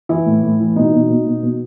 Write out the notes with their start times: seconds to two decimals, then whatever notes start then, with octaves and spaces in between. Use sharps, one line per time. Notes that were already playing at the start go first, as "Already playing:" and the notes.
0.09 E3 E4
0.26 A2
0.43 A2
0.60 E3
0.76 B2 D#4
0.93 B2
1.09 B2
1.26 B2
1.43 B2